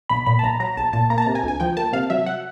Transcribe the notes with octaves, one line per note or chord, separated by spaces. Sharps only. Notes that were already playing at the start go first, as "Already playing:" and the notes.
B1 B5
A#2 B5
A5
B1 A#5
F#3 A#5
B1 A5
A#2 A5
A#3 A#5
A5
C3 A#5
G#5
D2
G#5
F3 G5
A#3 A5
C3 F5
F#3 E5
F#5